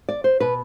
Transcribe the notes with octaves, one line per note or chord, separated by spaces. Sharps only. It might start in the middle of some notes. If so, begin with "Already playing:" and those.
D5
C5
B2 B4